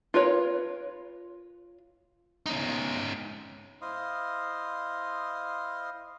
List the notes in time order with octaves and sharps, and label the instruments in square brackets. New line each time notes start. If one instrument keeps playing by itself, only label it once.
[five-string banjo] F4 A#4 B4 C#5
[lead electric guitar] C#4 D#4
[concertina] E4 C5 D#5 F5 C6 D#6